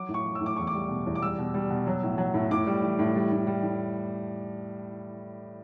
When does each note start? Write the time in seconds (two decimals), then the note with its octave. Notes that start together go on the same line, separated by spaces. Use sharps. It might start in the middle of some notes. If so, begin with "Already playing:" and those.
Already playing: F#3 D6
0.08 A2
0.14 C#6
0.25 F#3
0.35 E6
0.41 A2
0.46 D6
0.56 E2 C#6
0.67 D6
0.74 G3
0.89 B2
1.06 E2
1.15 D6
1.22 G3 E6
1.38 B2
1.54 G3
1.70 B2
1.87 F#3
2.03 A2
2.18 F#3
2.34 A2
2.51 A2 D6
2.67 G3
2.82 E3
2.99 A2
3.15 G3
3.32 A2
3.47 G3
3.63 A2